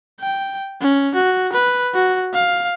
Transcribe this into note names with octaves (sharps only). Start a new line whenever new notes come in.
G5
C#4
F#4
B4
F#4
F5